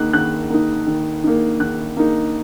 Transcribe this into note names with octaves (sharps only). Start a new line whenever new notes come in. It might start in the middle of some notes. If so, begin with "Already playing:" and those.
Already playing: D#3 A#3 D#4 F#6
D#3 F#6
A#3 D#4
D#3
A#3 D#4
D#3 F#6
A#3 D#4